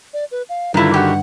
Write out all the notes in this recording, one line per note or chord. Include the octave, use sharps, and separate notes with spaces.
D5
B4
F5
G2 D3 D#3 F#3 E4 F4
F#4 G4 F#5